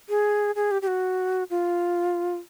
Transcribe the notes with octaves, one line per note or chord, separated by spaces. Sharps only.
G#4
G#4
G4
G4
F#4
F4